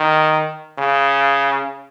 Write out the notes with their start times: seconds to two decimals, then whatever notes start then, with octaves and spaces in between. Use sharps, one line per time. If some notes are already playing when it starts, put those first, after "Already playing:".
Already playing: D#3
0.78 C#3